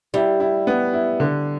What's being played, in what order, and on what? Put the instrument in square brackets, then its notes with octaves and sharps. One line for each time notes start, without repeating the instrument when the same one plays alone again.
[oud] G3 [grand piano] E4
[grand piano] E4
B3
E4
D3